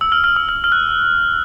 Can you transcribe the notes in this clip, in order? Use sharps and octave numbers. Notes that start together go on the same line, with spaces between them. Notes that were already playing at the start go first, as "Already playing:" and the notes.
E6
F6
F6
E6
F6
F6
F#6